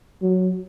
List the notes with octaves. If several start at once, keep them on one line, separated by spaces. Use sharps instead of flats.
F#3